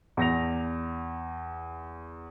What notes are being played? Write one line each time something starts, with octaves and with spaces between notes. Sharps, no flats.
E2 A#6 F7